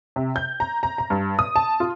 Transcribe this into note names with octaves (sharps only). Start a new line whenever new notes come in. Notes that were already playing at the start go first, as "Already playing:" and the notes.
C3
G6
A#5
A#5
A#5
G2
D#6
A5
F4